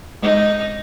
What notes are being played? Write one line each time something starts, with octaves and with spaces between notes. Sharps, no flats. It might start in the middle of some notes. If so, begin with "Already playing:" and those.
G#3 D#4 D#5